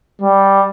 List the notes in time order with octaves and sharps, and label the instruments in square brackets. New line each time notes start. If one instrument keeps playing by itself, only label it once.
[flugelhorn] G3